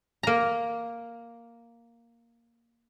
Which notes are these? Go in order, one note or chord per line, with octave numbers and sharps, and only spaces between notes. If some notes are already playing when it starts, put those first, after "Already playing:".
A#3 A#5